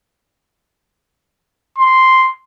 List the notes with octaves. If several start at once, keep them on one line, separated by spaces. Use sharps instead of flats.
C6